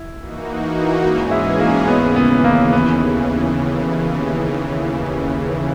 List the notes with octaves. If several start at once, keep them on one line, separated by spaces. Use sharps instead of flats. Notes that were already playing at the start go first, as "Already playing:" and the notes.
Already playing: E4
E3 A#3 D#4 F#4
G#2 E3 G#3 C#4 F#4 G#4
E4
A#3
D#2 C#3 E3 B3
B3
A#3
B3